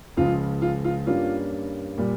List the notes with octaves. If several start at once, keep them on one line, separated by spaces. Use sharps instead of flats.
C#2 C#3 F3 G#3 F4
F4
F4
G2 G3 A#3 C#4 F4
A#2 G3